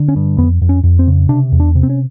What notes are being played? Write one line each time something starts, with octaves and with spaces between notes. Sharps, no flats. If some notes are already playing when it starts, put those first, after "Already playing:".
Already playing: D3
C#4
G2
F2 B3
F2
C#4
F2
C4
C#3
C3 D4
E2
D4
C3
C4
C#4